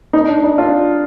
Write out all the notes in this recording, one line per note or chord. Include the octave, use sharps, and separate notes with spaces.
D#4
D4
D#4
D4 F4